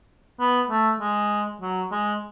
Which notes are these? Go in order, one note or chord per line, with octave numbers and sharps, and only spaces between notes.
B3
A3
G#3
F#3
G#3